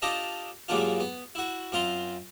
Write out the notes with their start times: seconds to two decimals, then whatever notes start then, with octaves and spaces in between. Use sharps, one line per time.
0.02 D4 F4 G4 A4 D#5 A#5
0.68 G2 F#3 G#3 A#3 D4 F4
1.00 B3
1.35 E4 F#4
1.72 F#2 C4 F4 A#5 C6